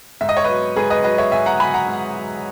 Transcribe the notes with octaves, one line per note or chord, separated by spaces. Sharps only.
G#2 E5
D#5
C#5
F#3 B4 D#5
G#2 G#4 B4
B4 D#5
F#3 B4 D#5
C#5 E5
G#2 E5 G#5
F#5 A#5
F#3 G#5 B5
F#5 A#5
G#2
F#3